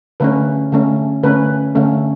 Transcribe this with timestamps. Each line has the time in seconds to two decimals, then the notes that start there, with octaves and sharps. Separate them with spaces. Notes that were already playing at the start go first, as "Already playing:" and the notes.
0.20 D3 A3 C#4 B4
0.72 D3 A3 C#4
1.23 D3 A3 C#4 B4
1.75 D3 A3 C#4